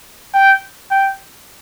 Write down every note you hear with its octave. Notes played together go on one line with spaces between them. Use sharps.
G5
G5